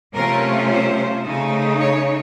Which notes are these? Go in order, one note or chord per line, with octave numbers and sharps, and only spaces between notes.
C3 F#3 A3 C#4 F4 A#4
C5
C#3 A3 D#4
C#5